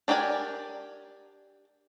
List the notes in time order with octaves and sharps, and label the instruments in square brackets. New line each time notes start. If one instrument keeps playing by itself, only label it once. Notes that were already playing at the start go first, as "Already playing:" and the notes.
[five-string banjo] D4 G4 A#4 D5 G#5